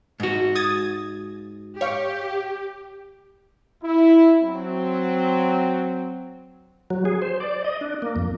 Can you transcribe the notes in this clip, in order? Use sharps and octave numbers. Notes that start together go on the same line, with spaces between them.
G#2 F#4
D#6 G#6 A6
G4 C#5 F5 C#6
E4
F#3 C4
F#3
G#4
C5
D5
D#5
D4
A#3
F2